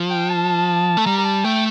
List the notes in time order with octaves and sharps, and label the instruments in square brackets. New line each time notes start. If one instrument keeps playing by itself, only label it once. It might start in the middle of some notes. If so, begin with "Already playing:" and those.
Already playing: [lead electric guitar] F3
[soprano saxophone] G5
A5
[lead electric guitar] A3
[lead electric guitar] G3 [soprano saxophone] A#5
[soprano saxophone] A#5
A5
[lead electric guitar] A3 [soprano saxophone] G5